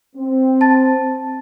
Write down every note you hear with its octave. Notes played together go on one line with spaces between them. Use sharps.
C4
A5 A6